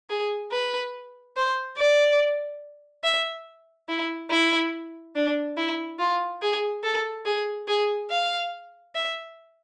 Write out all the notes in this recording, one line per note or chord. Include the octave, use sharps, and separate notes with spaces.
G#4
B4
C5
D5
E5
E4
E4
D4
E4
F4
G#4
A4
G#4
G#4
F5
E5